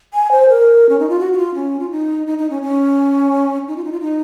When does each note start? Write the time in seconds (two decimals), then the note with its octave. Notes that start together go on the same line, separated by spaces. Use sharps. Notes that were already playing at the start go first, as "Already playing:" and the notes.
0.14 G#5
0.32 C5
0.49 A#4
0.89 C#4
0.99 D#4
1.09 F4
1.20 F#4
1.33 F#4
1.38 F4
1.55 C#4
1.80 F4
1.91 D#4
2.27 D#4
2.38 D#4
2.50 C#4
2.62 C#4
3.68 D#4
3.77 F4
3.84 D#4
3.92 F4
4.01 D#4